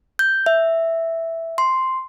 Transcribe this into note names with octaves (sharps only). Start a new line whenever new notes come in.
G6
E5
C6